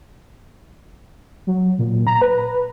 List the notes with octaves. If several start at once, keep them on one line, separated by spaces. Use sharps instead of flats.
F#3
A#2
A#5
B4